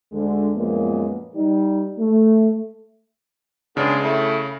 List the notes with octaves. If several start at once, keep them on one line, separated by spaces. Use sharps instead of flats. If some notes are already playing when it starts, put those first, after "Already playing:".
D2 D3 G#3
F#2 A#2 F3 G#3 A#3 B3
G3 D#4
A3
C#3 G#3 B3 D4
A3 E4